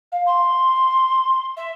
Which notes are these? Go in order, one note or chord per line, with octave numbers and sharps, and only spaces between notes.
F5
C6
E5